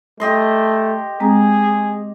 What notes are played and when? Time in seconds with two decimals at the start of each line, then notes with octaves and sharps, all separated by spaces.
0.20 A3 G4 D#5 C6
1.20 G#3 C4 G#4 A#5